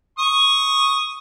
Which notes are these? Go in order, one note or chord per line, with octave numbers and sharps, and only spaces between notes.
C#6 D#6